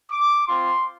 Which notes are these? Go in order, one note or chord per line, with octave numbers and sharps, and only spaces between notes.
D6
C4 F4 C6